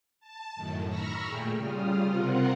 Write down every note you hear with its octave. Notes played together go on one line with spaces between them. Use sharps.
A5
F#2 A2 D#3
A#5 B5 C#6 E6 F6 A#6
A#2 A3 G#4 G5
C#3 G3 F4 D#6 F6
C3 C4 F4 A#4 F#5